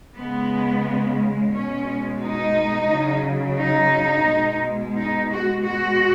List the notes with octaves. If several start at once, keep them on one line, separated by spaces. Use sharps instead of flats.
C#3 G#3 B3
B2 G#3 C#4
D#4
C#3 F#3
D#4
B2 G#3
D#4
F#4
B2 G#3 F#4